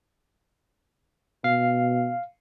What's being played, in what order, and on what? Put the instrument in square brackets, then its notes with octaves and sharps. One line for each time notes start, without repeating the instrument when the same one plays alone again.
[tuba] B2 [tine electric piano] F5